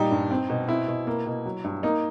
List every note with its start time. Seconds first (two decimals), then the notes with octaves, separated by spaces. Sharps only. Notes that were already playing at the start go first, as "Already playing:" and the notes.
Already playing: A#2 G3 D#4
0.11 G2
0.31 C4
0.50 B2
0.69 C4 E4
0.88 B2
1.07 A#3
1.26 B2
1.46 F#3
1.64 G2
1.83 A#3 D#4